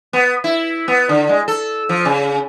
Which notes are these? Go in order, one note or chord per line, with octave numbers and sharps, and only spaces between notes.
B3
E4
B3
D3
G#3
A4
F3
C#3